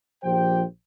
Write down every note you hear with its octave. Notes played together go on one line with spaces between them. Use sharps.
A#1 F3 G4 C5 G5